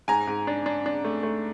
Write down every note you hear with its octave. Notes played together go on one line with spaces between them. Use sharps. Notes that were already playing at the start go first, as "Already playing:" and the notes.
G#2 G#5 A#5
G#2
D4
D4
D4
A3
A3